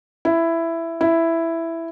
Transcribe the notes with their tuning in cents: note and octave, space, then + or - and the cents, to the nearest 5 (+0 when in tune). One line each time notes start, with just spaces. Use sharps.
E4 +10
E4 +5